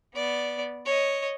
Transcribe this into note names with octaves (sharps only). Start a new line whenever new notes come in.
B3 D5
C#5 D#5